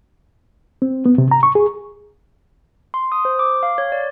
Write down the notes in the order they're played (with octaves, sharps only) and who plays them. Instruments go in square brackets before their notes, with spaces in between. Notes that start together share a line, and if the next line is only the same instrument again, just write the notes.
[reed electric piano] C4
B3
C3
A#5
C#6
G#4
[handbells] C6
D#6
C5
D6
F5
C#5
D5